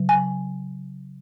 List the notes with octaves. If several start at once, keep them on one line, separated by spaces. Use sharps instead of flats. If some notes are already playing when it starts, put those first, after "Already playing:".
Already playing: C#3 F#3
G#5